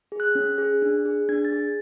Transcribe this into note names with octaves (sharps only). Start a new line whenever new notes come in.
G#4
F#6
C#4
G#4
D4
G#4
D4 G#6
A6
G#4